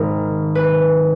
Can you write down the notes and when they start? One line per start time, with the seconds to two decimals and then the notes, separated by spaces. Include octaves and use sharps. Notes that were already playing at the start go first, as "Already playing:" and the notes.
Already playing: G#1 G#2 D#3 A#4
0.55 B4